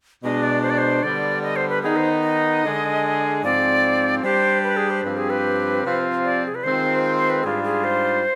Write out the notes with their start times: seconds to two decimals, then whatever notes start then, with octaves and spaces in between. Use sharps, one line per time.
0.23 B2 G#3 D4 D#5
0.43 D5
0.63 C5
0.70 D5
0.78 C5
1.03 D3 G3 B3 D5
1.43 D#5
1.56 C5
1.69 B4
1.83 D#3 B3 D#4 G#4
1.96 C5
2.23 D#5
2.63 D3 G#3 D4 G#4
3.43 G#2 F3 C4 D5
4.23 G3 D4 G4 C5
4.64 B4
4.77 G#4
4.90 C5
5.04 G2 F3 C4 G4 B4
5.17 G#4
5.30 B4
5.83 C3 F3 C4 F4
6.24 D5
6.46 G#4
6.55 B4
6.63 D#3 G#3 C4 F4 C5
7.04 C5
7.17 C5
7.30 B4
7.44 G#2 G3 D4 F4 G#4
7.64 G#4
7.84 C5